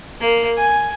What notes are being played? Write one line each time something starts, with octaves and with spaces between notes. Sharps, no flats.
A#3
G#5